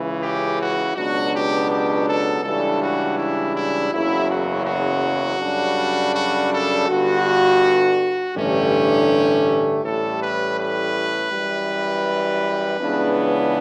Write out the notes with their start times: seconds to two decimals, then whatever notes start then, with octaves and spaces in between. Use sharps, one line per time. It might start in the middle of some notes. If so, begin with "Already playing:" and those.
Already playing: C#2 C#3 E3
0.21 G4
0.58 F#4
0.95 C#2 B2 F#3 B3 D4 F#4
1.32 G4
1.69 G4
2.06 A4
2.43 C#2 C#3 E3 G3 D4 A4
2.80 F#4
3.17 E4
3.54 E4
3.91 F#1 E2 C#3 F#3 E4
4.28 F#4
4.64 F#4
5.39 F#2 C#3 G3 D4
6.13 F#4
6.50 A4
6.87 G1 G2 D3 F#4
8.34 A1 G2 D3 A3 C#4 G4
9.82 A1 A2 G3 A4
10.20 B4
10.57 B4
11.30 F#2 E3 G3
12.78 C#2 C#3 E3 B3 D4